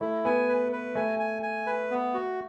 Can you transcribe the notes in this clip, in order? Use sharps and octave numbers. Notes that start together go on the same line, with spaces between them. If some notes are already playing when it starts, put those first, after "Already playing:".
A3 E4
B3 G#5
B4
B4
A3 G#5
G#5
G#5
B4
B3
F#4